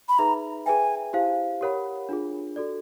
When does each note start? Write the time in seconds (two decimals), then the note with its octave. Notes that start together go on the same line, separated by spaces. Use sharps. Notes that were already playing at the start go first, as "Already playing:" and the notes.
0.09 B5
0.19 D#4 G#4 B4 E5 A#5
0.66 G#4 B4 E5 G5 G#5
1.13 E4 G4 C5 F5
1.61 G4 A#4 C#5 F#5 B5
2.09 D4 F4 G#4
2.56 F#4 A4 D5